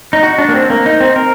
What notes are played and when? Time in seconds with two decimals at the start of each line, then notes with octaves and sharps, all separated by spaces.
0.13 D#4
0.23 F#4
0.38 D4
0.49 A#3
0.54 C4
0.70 A#3
0.86 D#4
1.00 C4
1.16 A#4